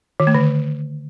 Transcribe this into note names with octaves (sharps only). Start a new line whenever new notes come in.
D#3
A3
D3